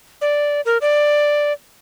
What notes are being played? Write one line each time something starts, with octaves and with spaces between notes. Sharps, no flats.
D5
A#4
D5